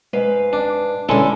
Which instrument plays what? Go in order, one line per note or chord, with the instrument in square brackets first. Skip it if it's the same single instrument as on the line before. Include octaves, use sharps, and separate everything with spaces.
[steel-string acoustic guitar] G#2 B4 F5
[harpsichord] D4
[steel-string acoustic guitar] D3 C#4 [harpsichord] G#3 E4 A4